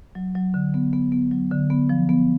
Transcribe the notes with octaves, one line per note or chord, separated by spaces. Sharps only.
F#3
F#3
D3
B3
B3
B3
F#3
D3
B3
F3
B3